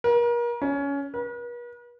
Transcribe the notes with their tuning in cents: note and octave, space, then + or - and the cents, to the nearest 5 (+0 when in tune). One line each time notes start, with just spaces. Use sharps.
A#4 +35
C#4 +20
B4 -45